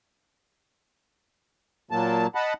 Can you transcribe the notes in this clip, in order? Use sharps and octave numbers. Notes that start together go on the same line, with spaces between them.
A#2 F#3 A#3 A5
D#5 F#5 A5 B5